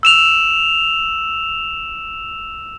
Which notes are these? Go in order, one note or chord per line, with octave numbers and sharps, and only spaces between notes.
E6 E7 F7